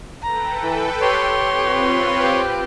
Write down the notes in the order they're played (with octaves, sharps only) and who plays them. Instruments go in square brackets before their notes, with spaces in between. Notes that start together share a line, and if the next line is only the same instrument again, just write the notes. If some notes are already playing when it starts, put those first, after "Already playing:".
[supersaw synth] A4 B4 G5 [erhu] A#5
[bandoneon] E3
[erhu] G4 [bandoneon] C#5 C6
[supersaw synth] C4 F4 B4
[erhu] G4